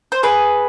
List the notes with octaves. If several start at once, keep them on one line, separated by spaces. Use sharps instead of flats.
C5
G#4 B4